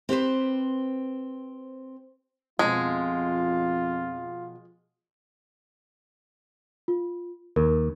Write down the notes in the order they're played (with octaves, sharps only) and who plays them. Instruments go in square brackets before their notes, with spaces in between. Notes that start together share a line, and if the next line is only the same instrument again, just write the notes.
[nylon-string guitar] C4 G4 B4 C5
[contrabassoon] F2 [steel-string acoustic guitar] B2 F3 [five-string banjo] G#3 [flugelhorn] F4
[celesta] F4
[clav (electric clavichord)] D#2 [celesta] A#4